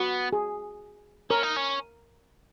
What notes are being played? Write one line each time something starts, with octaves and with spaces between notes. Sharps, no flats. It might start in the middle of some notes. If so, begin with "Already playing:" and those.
Already playing: B3 F#4
G#4
C#4 A#4
D#4
C#4